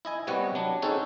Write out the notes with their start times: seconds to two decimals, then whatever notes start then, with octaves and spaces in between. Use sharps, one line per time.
0.05 E4 D#5 G#5
0.27 C3 G3 B3 C#5 D#5 F#5
0.55 F#3 D4
0.82 C4 C#4 D#4 F#4 G#4 A4